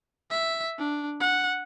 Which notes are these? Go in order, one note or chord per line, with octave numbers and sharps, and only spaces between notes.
E5
D4
F#5